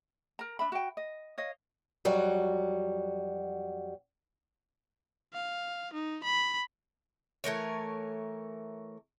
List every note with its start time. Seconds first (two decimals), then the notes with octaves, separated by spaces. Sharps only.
0.39 A#4 A#5
0.59 D4 E5 B5
0.72 F#4 G5
0.97 D#5
1.38 C#5 D#5 F5
2.05 F2 F#3 G3 F#4
5.33 F5
5.93 D#4
6.24 B5
7.44 E3 A3 A#4 C#5